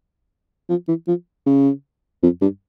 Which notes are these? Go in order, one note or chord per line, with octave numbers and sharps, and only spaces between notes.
F3
E3
F3
C#3
F2
G2